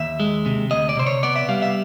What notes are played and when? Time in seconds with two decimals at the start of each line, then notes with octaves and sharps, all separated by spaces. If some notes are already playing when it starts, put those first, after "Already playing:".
Already playing: D#2 E5
0.20 G#3
0.46 C3
0.71 D2 D#5
0.89 D5
0.97 C3 C5
1.06 C#5
1.23 B3 D5
1.36 E5
1.49 G3 F5
1.62 E5